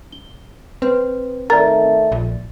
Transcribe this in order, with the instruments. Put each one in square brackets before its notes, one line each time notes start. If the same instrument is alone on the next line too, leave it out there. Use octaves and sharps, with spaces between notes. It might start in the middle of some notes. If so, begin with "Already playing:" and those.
[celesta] G7
[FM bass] C4 [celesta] B4
[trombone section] D#3 A3 [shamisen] A#4 [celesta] D5 A6
[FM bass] A#1